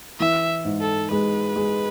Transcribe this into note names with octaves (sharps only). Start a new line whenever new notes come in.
E3 E5
G#2
A4
G#3 B4
G#3